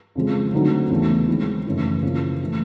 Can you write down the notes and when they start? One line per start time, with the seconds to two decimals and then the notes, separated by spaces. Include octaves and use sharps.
0.15 F2 C#3 F3 G#3
0.53 D3 F#3 A3 C4 D#4
0.90 E2 C#3 F#3 A3
1.28 D#3 G#3 C4 E4
1.66 F#2 C#3 E3 A3
2.03 C#3 F3 A#3
2.43 E3 A3